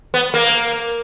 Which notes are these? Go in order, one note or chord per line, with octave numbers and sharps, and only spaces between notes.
B3
A#3